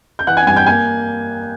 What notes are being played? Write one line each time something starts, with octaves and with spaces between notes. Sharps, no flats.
G6
E3 F#5 F#6
G#5 G#6
G2 G#5 G#6
G5 G6
A#3 G#5 G#6